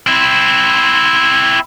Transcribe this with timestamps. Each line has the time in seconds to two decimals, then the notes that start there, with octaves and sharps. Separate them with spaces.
0.07 C4 E4